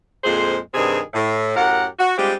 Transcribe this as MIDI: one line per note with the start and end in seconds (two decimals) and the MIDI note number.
0.24 0.57 41
0.24 0.57 46
0.24 0.57 56
0.24 0.57 68
0.24 0.57 72
0.74 0.99 43
0.74 0.99 48
0.74 0.99 51
0.74 0.99 60
0.74 0.99 68
1.14 1.55 45
1.57 1.86 42
1.57 1.86 45
1.57 1.86 67
1.57 1.86 70
1.57 1.86 78
1.99 2.15 66
2.17 2.33 55
2.17 2.33 56
2.17 2.33 60
2.17 2.33 62
2.17 2.33 65
2.17 2.33 67